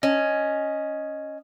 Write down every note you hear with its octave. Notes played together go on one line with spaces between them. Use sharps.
C#4 D#5